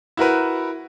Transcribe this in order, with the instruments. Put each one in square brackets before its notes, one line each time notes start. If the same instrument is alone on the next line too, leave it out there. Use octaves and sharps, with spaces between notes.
[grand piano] E4 F#4 A#4 B4